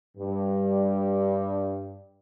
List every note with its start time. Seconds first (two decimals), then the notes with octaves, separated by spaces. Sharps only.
0.17 G2 G3